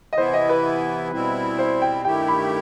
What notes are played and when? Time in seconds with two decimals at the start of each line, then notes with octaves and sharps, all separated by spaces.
0.13 D#5
0.18 C3 E3 B3 E4 C5
0.34 D#5
0.49 B4
1.12 B2 G3 C4 E4
1.58 C5
1.82 G5
2.04 G2 D#3 A3 E4 G4 G5
2.28 B5